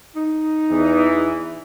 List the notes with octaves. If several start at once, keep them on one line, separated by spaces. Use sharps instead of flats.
D#4
E2 E3